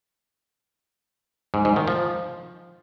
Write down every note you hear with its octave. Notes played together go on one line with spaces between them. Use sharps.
G#2
G#2
D#3
F3